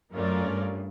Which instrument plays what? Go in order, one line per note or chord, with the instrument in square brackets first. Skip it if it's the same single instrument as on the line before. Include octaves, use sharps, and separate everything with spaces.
[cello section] F#2 [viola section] A3 C#4 F4 A#4 D5
[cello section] G2